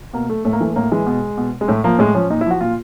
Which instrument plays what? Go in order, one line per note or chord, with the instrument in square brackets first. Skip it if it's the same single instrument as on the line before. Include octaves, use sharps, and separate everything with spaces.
[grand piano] B2 A#3
A3
A2 A3
A#3
E3 A3
A3
A2 A#3
E3 G#3
B2
B2
G#3
A2 A3
F3 A#3
A2 G#3
F3 C#4
A#2 D#4
E4
F3 F#4
A#2 F4